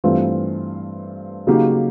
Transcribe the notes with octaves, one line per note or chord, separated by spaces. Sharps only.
G2 E3 A3 C4 F4
C#3 F#3 A#3 D#4 G4